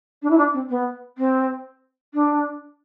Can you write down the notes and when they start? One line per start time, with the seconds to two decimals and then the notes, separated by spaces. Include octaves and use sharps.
0.22 D4
0.30 E4
0.37 D4
0.54 C4
0.70 B3
1.18 C4
2.14 D4